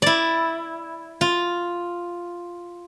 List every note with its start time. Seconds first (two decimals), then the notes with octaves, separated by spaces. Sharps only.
0.02 E4 D5
1.21 F4